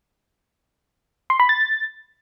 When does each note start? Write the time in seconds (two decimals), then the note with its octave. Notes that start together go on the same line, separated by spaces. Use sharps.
1.30 C6
1.40 B5
1.49 A6